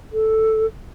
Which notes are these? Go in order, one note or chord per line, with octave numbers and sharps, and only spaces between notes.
A4